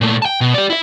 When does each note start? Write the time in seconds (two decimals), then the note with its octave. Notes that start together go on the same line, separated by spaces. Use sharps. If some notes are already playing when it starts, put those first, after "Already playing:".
0.01 A#2 A3
0.22 G5 A5
0.41 B2
0.54 G4 D5
0.70 E4 E5